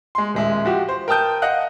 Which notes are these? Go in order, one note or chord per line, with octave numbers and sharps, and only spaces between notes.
G#3 C6
D#1 G#3 E5
F3 F#4 G4
C5
A#4 G5 A5 D#6 G6
D#5 F5 F#5 F#6